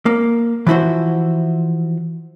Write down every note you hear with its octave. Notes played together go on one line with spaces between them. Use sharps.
A#3
E3 F3 E4 F#4 C5